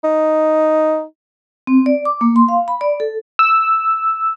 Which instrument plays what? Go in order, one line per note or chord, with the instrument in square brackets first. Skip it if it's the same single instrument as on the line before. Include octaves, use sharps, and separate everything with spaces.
[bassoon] D#4
[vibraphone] C4
D5
D6
A#3
C6
F5
B5
D5
A4
[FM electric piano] E6